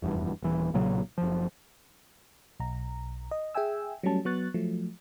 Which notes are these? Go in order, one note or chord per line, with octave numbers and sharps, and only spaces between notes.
F1 E2 G2
D#1 E3
B1 A#2 C#3 F#3
F#1 F3
B1 A#5
D#5
G#4 E5 G5 G#5 E6
F#3 G3 A3 C#4 A5
F#3 B3 C#6 F#6 A6
F3 F#3 A3